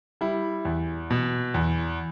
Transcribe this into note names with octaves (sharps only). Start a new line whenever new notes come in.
G3 E4
E2
B2
E2